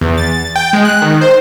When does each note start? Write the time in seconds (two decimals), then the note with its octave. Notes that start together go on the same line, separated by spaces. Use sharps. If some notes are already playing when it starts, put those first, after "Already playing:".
0.01 E2
0.18 A6
0.56 G5
0.73 G#3
0.85 F#6
1.02 D#3
1.21 C5